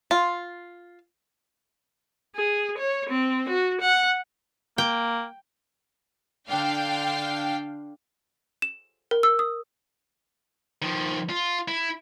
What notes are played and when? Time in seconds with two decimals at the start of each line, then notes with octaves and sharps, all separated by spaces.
0.11 F4
2.36 G#4
2.78 C#5
3.09 C4
3.49 F#4
3.81 F#5
4.78 A#3 G5
6.47 D3 D4 F5 G5
8.62 E7
9.11 A#4
9.23 E6
9.39 D#6
10.82 D#3 F3
11.30 F4
11.68 E4